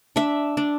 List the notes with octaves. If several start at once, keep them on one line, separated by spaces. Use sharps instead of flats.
D4 E5
D4